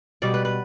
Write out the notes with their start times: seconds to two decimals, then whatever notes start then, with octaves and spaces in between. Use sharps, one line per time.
0.22 B2 G3 B3 D5
0.34 B4
0.45 B4